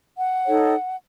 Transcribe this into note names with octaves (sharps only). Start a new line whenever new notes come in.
F#5
D#4 A4 C#5